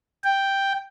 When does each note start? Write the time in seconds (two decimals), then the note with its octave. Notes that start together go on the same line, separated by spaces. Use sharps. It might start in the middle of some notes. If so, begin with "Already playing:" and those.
0.24 G5